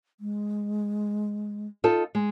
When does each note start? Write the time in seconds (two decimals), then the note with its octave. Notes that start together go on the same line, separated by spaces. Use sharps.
0.20 G#3
1.84 D#4 F4 A4
2.15 G#3